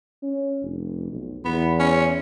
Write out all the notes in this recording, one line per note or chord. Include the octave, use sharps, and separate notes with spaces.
C#4
F1
B1
E2 B3
C#4